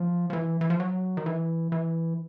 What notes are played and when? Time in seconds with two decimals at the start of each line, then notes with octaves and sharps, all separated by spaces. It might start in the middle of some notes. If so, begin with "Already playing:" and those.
Already playing: F3
0.30 F3
0.33 E3
0.61 E3
0.70 F3
0.80 F#3
1.17 D#3
1.26 E3
1.72 E3